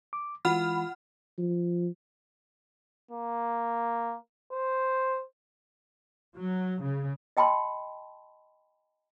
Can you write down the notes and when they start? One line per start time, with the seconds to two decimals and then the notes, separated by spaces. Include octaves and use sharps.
0.13 D6
0.45 E3 G#3 F4 F#5 B5 F6
1.39 F3
3.11 A#3
4.52 C5
6.37 F#3
6.83 C#3
7.37 D#5 G5 A5 B5 C6